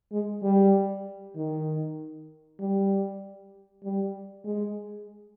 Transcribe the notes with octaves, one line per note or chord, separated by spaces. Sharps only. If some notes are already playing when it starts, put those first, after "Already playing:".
G#3
G3
D#3
G3
G3
G#3